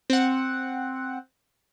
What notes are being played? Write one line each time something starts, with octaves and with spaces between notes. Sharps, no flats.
C4 F#5